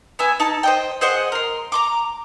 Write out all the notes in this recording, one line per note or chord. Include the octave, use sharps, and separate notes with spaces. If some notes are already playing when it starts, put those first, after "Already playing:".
B3 E5 G#5
D#4 A5
C5 D#5 G5
G#4 C5 D#5 F#5
A#4 C6
A#5 C6 D6